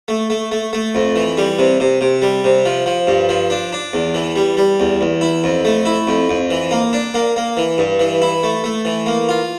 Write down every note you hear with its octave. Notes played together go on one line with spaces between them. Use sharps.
A3
A3
A3
A3
F2
E3
G3
C3
C3
C3
G3
C3
F3
F3
G2
F3
D4
D4
E2
E3
G3
G3
E2
E2
E4
F2
A3
E4
F2
F2
E3
A#3
D4
A#3
A#3
E3
G2
E3
E4
A3
A3
E3
A#3
F4